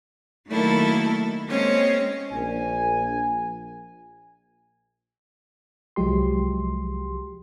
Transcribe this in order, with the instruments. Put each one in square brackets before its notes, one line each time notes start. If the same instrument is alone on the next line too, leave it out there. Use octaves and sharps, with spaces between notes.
[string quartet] D#3 F#3 A3 A#3 E4 A4
G#3 A#3 C4 C#4 C#5 D#5
[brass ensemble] A#1 G#5
[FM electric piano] C2 F3 F#3 G#3 G4 C6